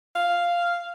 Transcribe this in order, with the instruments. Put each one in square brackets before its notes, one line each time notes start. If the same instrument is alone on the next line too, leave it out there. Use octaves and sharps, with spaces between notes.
[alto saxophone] F5